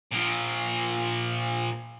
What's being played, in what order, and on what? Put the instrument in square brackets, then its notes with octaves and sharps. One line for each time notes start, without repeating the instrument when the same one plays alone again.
[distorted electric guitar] A#2 F3